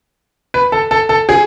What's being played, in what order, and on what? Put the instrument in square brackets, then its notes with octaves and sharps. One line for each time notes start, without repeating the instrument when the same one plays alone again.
[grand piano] B4
A4
A4
A4
G#4